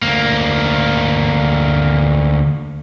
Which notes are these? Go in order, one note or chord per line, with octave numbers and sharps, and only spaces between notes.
D2 A#3